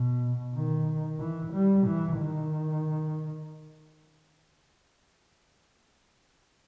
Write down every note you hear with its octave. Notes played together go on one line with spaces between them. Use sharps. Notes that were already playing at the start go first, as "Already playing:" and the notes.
Already playing: B2
D#3
E3
G3
E3
D#3